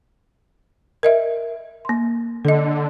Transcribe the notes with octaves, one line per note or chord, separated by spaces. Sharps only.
A#4 D#5 E5
A#3 C6
D3 A4 D#5